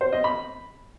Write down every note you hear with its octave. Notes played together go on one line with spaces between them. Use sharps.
C5
D#5
B5